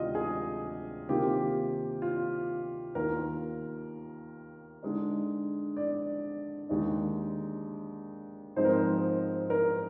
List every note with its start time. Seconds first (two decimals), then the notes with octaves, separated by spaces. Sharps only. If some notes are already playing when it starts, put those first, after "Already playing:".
Already playing: D2 C3 D#3 G#3 F4 G4 D#5
0.15 G#4
1.09 C3 D#3 A#3 F4 G4
2.02 F4
2.95 D#2 D#3 A#3 F4 A#4
4.83 D3 G#3 D#4
5.77 D5
6.69 D#2 D3 G#3 D#4
8.56 G#2 F3 G#3 C4 D#4 C5
8.65 A#4
8.73 C5
9.50 A#4